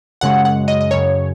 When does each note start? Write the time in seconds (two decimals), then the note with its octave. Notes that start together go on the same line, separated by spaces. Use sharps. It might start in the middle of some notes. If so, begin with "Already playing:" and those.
0.21 F#2 C#3 G#3 F#5
0.45 F#5
0.68 D#5
0.81 D#5
0.91 F#2 C#3 F#3 C#5